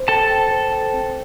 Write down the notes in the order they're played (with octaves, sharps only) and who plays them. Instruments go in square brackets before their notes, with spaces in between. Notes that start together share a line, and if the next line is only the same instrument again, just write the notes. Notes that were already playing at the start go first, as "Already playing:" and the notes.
Already playing: [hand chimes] C5
[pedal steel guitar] A4 A5 [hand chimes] G5
[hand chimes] G5
C5
G5
C4